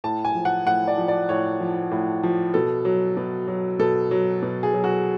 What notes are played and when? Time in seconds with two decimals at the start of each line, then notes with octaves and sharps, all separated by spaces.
0.04 A2 A5
0.25 G#5
0.35 F3
0.45 F#5
0.66 A2 F#5
0.88 D5
0.98 F3
1.08 D5
1.29 A2 C#5
1.60 F3
1.91 A2
2.23 F3
2.54 B2 A4
2.85 F#3
3.17 B2
3.48 F#3
3.79 B2 A4
4.11 F#3
4.42 B2
4.63 G#4
4.74 F#3
4.84 F#4